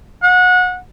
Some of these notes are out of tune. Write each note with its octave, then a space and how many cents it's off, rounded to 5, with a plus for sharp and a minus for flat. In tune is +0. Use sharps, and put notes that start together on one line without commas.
F#5 -25